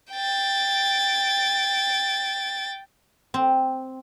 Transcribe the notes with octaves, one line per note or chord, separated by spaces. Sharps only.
G5 A6
C4